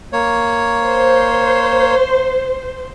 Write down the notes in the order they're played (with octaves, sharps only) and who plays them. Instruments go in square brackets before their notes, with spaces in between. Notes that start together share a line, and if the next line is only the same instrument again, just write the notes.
[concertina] A#3 C#5
[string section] C5